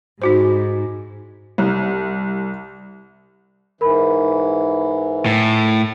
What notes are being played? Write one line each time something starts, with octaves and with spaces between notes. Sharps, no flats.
G#2 D#4 F#4 C5
C2
G#2 E3 A#4 B5
A2